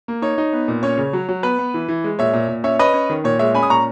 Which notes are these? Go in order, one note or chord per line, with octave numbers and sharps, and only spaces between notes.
A#3
D#4 C#5
D#4
B3
A#2
C#4 C#5
C#3
F#3
F#3
B3 B4
B3
E3
E3
G#3
A#2 C#5 E5
A#2
A#2
C#4 C#5 E5
C#4 B4 D#5
C#4
D#3
A#2 C#5
G#3 C#5 E5
C#4 G#5 B5
D#6
A#2 A#5 C#6